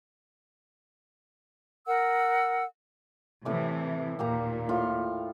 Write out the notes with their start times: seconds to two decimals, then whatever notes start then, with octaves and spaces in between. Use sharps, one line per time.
1.86 A#4 F#5 E6
3.45 A2 C3 E3 A3 D6
4.19 D#2 A#2 A#3 G4 A#5
4.69 A2 F4